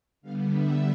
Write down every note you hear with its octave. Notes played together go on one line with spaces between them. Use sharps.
D3 G3 B3 F5
E5